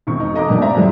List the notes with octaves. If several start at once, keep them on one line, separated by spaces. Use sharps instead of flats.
E1 C4 C#6
D#4
A4 D#5 A#5 D6
F#2 B2 A#3 D4 D#4
C5 D5 E5 A#5
F#2 A2 E3 F3 G3 G#3